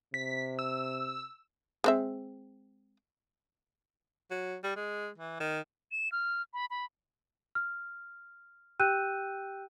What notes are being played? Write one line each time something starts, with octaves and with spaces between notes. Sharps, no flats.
C3 B6
E6
G#3 C4 E5
F#3
G3
G#3
E3
D#3
E7
F6
B5
B5
F6
G4 G5 E6 F#6 G6 D#7